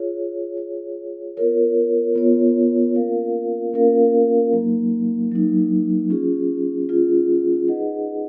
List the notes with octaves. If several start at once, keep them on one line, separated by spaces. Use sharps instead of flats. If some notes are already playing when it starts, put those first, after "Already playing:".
Already playing: F4 G#4 C#5
F4 G#4 C#5
B3 F4 A#4 C#5
B3 F4 A#4 C#5
A#3 C#4 F4 A#4 F5
A#3 C#4 F4 A#4 F5
F#3 A#3 D#4
F#3 A#3 D#4
C#4 F4 G#4
C#4 F4 G#4
D#4 G#4 B4 D#5 F#5